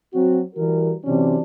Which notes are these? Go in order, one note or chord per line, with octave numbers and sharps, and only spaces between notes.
F#3 C4 F#4
E3 G3 F#4 A#4
C3 E3 F#3 C#4 D4